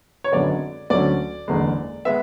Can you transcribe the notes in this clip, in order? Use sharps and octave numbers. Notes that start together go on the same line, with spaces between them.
C#5
G#1 F#2 D3 G#3 B3 D5
D2 D3 F#3 C#4 D5
F#1 E2 D3 G#3
G#3 B3 E5